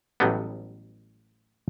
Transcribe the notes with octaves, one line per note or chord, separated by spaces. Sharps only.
A1 A2 F#3 G3 B3